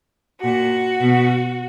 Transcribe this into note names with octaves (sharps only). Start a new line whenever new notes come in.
A#2 F#4
B2